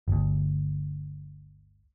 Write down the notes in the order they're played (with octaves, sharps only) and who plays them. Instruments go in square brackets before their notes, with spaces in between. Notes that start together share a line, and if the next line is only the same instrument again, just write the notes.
[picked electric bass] G1 D2